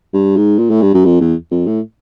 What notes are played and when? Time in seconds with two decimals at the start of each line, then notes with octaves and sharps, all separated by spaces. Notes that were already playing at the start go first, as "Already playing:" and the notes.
0.14 G2
0.37 G#2
0.59 A#2
0.70 A2
0.82 G2
0.94 F#2
1.05 F2
1.21 E2
1.51 F2
1.67 A2